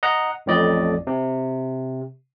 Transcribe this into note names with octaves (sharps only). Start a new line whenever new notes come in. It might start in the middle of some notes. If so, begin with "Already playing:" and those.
D#5 F#5 A#5
A1 F2 A2 D5 D#5
C3